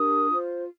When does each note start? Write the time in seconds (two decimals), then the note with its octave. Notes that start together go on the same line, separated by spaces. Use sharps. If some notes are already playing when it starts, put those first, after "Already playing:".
Already playing: D4 G4 A#4 D#6
0.28 F4 C5